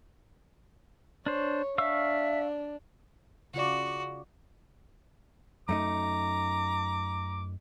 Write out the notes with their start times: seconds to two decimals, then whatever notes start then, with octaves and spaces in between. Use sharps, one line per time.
1.26 D4 C5 C#5
1.78 D4 E5 F5 C#6 E6
3.54 C#3 F4 F#4 D5
5.69 F#2 A3 D#4 A#5 D6